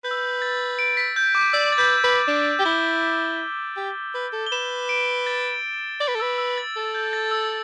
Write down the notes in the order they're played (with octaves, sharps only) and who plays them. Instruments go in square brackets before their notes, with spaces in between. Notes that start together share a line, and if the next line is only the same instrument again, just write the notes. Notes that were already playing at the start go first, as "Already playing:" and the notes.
[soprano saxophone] B4 [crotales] G6
[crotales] E6
G6
A6
D7
B6
G6
D6
[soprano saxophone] D5 [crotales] E6
[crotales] A6
[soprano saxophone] B4 [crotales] G6
[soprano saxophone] B4
[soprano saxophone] D4 [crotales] E7
[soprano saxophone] G4
[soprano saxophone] E4 [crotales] G7
[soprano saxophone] G4
B4
A4
[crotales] G7
[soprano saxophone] B4 [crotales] E7
[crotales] D7
A6
[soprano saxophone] D5 [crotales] A6
[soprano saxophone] B4
A4
[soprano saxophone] B4 [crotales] E6
[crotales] E6
A6
[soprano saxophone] A4
[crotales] G6
A6
E6